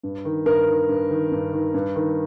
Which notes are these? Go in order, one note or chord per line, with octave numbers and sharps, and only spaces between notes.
G2
D#3
G2 A#4
D#3
G2
D#3
G2
D#3
G2
D#3